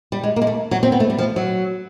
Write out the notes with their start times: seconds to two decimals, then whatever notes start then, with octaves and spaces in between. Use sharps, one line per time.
0.12 G3
0.23 G#3
0.36 A#3
0.42 G#3
0.47 A3
0.71 F#3
0.83 C4
0.92 B3
1.00 A3
1.10 G3
1.18 F3
1.36 F#3